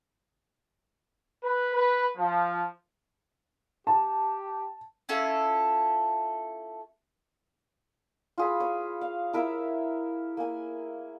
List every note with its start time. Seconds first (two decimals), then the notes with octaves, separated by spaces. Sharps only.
1.43 B4
1.75 B4
2.17 F3
3.87 G4 A5
5.09 C#4 E4 F4 A4
8.38 F4 G#4 B5
8.60 C#5
9.01 F5
9.33 E4 A#4 E5 F5
10.37 A#3 G#5